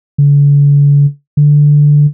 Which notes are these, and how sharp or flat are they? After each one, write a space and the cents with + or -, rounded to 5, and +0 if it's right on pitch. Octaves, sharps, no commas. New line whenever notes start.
D3 -45
D3 +0